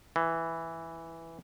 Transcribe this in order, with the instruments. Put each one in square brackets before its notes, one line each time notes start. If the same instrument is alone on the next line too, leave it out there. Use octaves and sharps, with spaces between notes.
[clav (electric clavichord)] E3